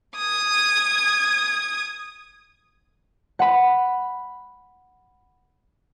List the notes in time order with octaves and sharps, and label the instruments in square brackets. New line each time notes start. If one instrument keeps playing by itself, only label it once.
[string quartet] D#6 G#6
[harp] F#5 B5